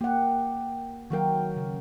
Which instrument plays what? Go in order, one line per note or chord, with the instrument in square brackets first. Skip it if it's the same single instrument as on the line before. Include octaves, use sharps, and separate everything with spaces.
[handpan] A#3 F#5 [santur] G4
[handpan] D#3 F#3 A#4 [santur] F#4 F5 G5
[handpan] C#3